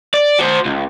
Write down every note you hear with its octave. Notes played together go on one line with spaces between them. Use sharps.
D5
F#4 C5
C#2